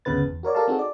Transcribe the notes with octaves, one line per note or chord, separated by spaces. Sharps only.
G1 D2 C#3 B3 B4 A6
E2
F#4 A#4 C#5 D5
G4 A4 A#4 D5 F5 A5
C4 D#4 F#4 G#4 A4
D5